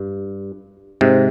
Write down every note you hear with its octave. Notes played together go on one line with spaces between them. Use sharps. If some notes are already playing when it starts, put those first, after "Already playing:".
Already playing: G2
G#2 C3